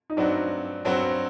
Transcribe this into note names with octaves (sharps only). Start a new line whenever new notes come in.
D#4
G2 F#3 C4 D4 F#4
G2 F#3 C4 F#4